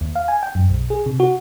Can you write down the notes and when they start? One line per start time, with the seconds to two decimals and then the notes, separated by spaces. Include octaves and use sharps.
0.01 D#2
0.15 F5
0.28 G#5
0.43 G5
0.55 F#2
0.70 B1
0.90 G#4
1.06 C3
1.20 F#4